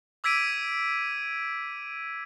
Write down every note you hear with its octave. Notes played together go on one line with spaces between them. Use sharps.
D6 E6 G#6 B6 D7 D#7